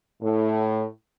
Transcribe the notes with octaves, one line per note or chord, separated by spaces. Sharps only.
A2